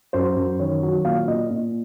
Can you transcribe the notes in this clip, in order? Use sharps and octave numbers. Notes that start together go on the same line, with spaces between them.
F#2 C5
F#2
D#3 C#5
F#3
A#2 F5
A#2 D#5
A#2